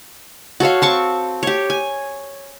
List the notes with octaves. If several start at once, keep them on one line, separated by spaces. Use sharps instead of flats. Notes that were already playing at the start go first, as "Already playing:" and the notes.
F#4 A4 C#5 F5
C4 A5 C#6
G4 C#5
G#5